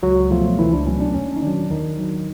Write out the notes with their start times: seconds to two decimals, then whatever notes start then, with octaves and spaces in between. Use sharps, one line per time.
0.03 C#2 F#3 F#4
0.31 B2 F3 F#3 A3 F4
0.59 C#2 E3 E4
0.73 D4
0.87 B2 F#3 A3 C#4
1.00 D4
1.15 D#2 C#4
1.36 D#4
1.42 D#3 F#3 D4
1.71 D#2 D#3 D#4
1.99 D#3 F#3